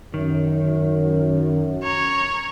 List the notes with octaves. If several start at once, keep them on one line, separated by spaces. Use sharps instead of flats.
F#2 D#3
C#5 A#5